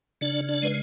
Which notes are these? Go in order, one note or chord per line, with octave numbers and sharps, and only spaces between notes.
C#3 D4 D5
D4 D5
G#3 B4